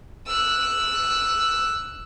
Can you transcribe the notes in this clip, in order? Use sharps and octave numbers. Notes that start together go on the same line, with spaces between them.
E6 F#6